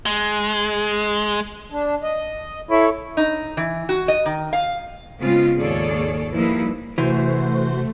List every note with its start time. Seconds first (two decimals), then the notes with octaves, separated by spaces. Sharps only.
0.06 G#3
1.70 D4
2.03 D#5
2.71 E4 A4 C#5
3.17 D#4
3.57 E3
3.89 F#4
4.08 D#5
4.26 D#3
4.53 F5
5.21 C#3 G#3 B3 C4 F4
5.59 D#2 G#2 G#4 A4 C#5 D5
6.35 F3 G3 A#3 D#4 E4 B4
6.98 C3 E3 A3 F#4 C5